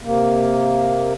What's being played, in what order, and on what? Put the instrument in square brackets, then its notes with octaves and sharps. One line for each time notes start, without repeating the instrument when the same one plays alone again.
[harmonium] C3 A#3